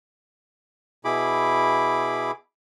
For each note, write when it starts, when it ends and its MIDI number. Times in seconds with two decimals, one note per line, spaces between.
1.05 2.31 47
1.05 2.31 64
1.05 2.31 68
1.05 2.31 83
1.05 2.31 86